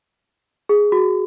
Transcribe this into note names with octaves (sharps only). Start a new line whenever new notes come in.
G#4
F#4